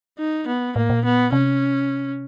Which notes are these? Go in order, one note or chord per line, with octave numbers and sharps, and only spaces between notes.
D#4
B3
A2 A#3
A#2
B3
C3 C#4